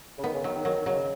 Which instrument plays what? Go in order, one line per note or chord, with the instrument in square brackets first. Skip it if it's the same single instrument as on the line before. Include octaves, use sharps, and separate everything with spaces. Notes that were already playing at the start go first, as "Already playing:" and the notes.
[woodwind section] C#3
[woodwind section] D#3 [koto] B3
[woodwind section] C#3
[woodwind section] D#3 [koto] F#3
[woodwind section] D#3
[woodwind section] D#3 [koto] F#3
[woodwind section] C#3 [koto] F#3